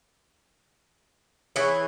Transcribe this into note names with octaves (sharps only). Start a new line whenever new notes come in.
E3 G#4 C#5 C#6